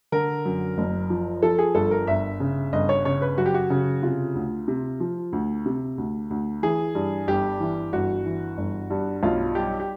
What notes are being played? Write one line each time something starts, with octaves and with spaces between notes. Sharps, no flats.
D3 A#4
F#2
F#1
F3
F3 A4
G#4
G1 A4
A#4
G1 E5
C#3
G1 D#5
C#5
C#3 C#5
B4
F#2 F#4
G4
F#4
C#3
C3 F4
D2
C3
F3
D2
C3
D2
D2
E3 G#4
G2
G1 G4
E3
G1 F#4
E3
G1
G2
B1 F4
G3 G4
G4